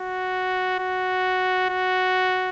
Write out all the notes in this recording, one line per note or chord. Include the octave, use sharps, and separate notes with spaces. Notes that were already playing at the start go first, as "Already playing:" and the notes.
Already playing: F#4
F#4
F#4